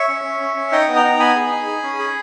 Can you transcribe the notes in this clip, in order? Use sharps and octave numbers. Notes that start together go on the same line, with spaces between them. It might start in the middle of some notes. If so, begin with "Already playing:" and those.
Already playing: C#5 E5
C#4
C#4
C#4
C#4
D#4 D#5 G5
B3
G5 A#5
D#4
B3 G#5 B5
G#4
D#4
G#4
C#4
G#4